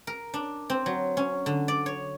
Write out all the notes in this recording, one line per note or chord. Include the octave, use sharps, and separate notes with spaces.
A#4
D4
C4
F#3
C#4
D3
D5
C#5